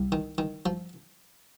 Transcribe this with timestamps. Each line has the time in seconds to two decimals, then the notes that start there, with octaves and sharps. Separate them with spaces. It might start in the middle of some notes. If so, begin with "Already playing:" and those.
Already playing: C2
0.12 D#3
0.38 D#3
0.66 F3